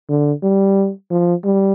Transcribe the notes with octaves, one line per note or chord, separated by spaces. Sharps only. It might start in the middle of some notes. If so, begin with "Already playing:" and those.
D3
G3
F3
G3